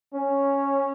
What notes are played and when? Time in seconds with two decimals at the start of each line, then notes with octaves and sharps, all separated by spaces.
0.13 C#4